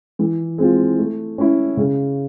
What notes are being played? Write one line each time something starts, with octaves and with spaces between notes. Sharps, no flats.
E3
G#3 C4 F4
A3
C#4 E4
C#3